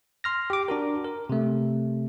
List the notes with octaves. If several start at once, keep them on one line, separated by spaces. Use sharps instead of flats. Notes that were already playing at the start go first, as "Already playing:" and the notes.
C6 F6 A#6
G4 D6
D4 F#4 A#4
A#4
C3 A3